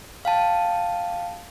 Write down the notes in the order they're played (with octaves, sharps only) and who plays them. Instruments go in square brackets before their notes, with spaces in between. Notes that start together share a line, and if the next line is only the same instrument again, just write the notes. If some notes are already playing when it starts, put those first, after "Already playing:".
[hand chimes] F5 G5 A5